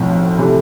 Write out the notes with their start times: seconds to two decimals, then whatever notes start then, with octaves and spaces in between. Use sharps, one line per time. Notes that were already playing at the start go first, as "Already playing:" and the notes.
Already playing: B1 A2 F3 C4
0.38 C3 E3 A3